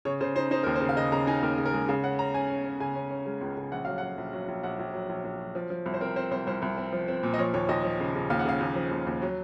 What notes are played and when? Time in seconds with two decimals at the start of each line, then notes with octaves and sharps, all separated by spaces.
0.05 C#3 C#5
0.21 C#3 C5
0.36 D#4 C5
0.51 D#4 C5
0.63 D#2 A#4
0.75 C5
0.81 C#3
0.89 F5
0.97 C#3 D#5
1.12 C#3 A#5
1.27 D#4 G#5
1.43 D#2 A#4
1.58 C#3
1.65 A#4
1.73 G#3
1.88 C#3 F5
2.04 C#4 F#5
2.19 C#4 A#5
2.34 C#4 G#5
2.50 C#4
2.65 C#4
2.80 C#3 G#5
2.95 C#4
3.11 C#4
3.26 G#3
3.41 C#2
3.57 C#3
3.72 A#1 F#5
3.85 F#3 F5
3.98 F#3 F#5
4.18 A#1
4.33 F#3
4.48 A#1
4.63 A#1 F#5
4.79 A#1
4.94 F#3
5.09 A#1
5.25 A#1
5.40 F#3
5.55 F3
5.70 F3
5.86 C2
5.94 C5
6.01 C4 A#4
6.16 C4 C5
6.31 C2 C5
6.47 C2 C5
6.62 C2
6.77 C4
6.93 F3
7.08 C4
7.23 A#2
7.34 D#5
7.39 F3 C#5
7.54 D#2 C#5
7.69 D#2 D#5
7.84 F3
8.00 C#3
8.15 C#3
8.30 D#2 F5
8.39 F#5
8.45 C#3 F5
8.61 D#2
8.76 F3
8.91 D#2
9.07 D#2
9.22 F#3